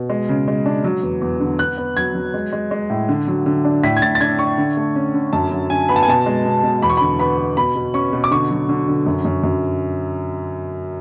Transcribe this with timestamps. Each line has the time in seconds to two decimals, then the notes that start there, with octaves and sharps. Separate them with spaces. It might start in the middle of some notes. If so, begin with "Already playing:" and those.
Already playing: B2
0.10 G#3
0.29 C#3
0.48 G#3
0.66 D4
0.84 F#3
1.03 E2
1.21 E2
1.40 D3
1.59 B3 F#6
1.78 B3
1.97 F#3 G#6
2.15 F#3
2.34 G#3
2.53 G#3
2.71 G#3
2.90 A2
3.09 D3
3.28 F#3
3.46 D3
3.65 D4
3.84 A2 B6
3.97 G#6
4.02 A2 A6
4.15 A6
4.21 D4 G#6
4.39 D4 C#6
4.58 D3
4.77 A3
4.95 C#4
5.14 D3
5.33 F#2 A5
5.52 F#3
5.70 D3 G#5
5.89 B3 B5
5.96 A5
6.03 G#5
6.08 B2 A5
6.26 G#3
6.45 B2
6.63 B2
6.82 E2 B5
6.90 C#6
6.97 D3 B5
7.20 B3 B5
7.38 B3
7.57 B2 B5
7.76 B2
7.94 C#4 C#6
8.13 B2
8.24 D6
8.31 D3 C#6
8.50 F#3
8.69 D3
8.88 D3
9.06 F#2
9.25 F#2
9.44 F#2